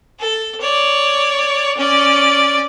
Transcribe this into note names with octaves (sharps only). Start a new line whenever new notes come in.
A4
C#5 D5
C#4 D5